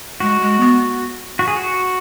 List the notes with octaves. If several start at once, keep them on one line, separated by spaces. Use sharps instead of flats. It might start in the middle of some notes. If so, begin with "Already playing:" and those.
G#3 F#4
G#3
B3
F#4
G#4
F#4